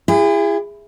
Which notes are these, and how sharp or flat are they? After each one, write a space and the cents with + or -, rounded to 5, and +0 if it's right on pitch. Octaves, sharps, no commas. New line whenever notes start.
E4 +35 G#4 -35